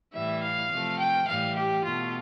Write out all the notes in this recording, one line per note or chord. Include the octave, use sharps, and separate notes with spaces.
A2 E3 G3 E5
F5
C3 F3 A3
G5
A2 E3 G3 F5
G4
B2 A3 F4